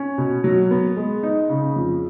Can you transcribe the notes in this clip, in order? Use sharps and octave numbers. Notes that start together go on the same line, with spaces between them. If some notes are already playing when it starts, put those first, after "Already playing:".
Already playing: C#4
B2
F#3
B3
G#3
D#4
C#3
F2